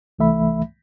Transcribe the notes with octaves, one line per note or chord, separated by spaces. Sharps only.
C2 E3 A3 E5 B5